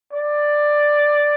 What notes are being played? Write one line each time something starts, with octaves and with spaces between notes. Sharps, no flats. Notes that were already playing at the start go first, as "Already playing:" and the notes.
D5